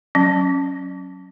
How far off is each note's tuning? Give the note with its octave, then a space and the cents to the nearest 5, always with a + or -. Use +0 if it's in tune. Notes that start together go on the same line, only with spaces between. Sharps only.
F#3 +0 C#4 -10